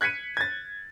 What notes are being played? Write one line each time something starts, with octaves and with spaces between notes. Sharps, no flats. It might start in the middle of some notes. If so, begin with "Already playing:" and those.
F#6 G#6 B6 C#7 D#7
G#6 A6